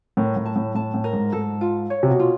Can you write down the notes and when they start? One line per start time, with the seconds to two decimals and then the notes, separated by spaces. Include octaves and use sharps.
0.17 A2 A#4
0.36 A2
0.45 A5
0.56 A2
0.75 A2 A5
0.94 A2
1.04 A#4
1.13 G#2
1.32 G#2 A4
1.61 F4
1.90 C#5
2.03 C3
2.09 B2
2.19 F4